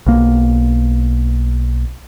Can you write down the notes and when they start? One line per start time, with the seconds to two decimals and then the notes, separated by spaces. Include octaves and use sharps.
0.06 B1 A#3